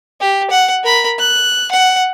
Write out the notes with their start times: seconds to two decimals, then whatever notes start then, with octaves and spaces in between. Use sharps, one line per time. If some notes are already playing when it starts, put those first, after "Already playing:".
0.21 G4
0.50 F#5
0.84 A#4 B5
1.19 F#6
1.71 F#5